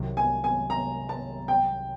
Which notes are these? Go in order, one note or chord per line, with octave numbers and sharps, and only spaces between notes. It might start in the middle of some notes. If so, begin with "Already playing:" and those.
Already playing: C2 C3 D#3 F#3
G#5
G#5
A#5
A5
G5